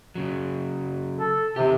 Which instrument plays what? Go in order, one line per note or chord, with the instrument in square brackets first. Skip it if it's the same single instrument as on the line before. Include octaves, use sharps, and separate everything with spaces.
[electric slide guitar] C#3 F#3
[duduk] A4
[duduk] C3 [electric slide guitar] D#3 G4